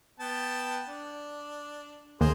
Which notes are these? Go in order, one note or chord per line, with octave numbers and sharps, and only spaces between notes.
B3 G5 A5
D4
D#2 G#4 A#4 C5